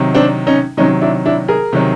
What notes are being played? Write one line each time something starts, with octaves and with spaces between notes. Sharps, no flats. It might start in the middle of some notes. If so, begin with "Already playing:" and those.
Already playing: C3 D#3 F#3
C4 D4
C#4 D#4
C3 D#3 F#3 C#4 D#4
D4 E4
D4 E4
G#4 A#4
C3 D#3 F#3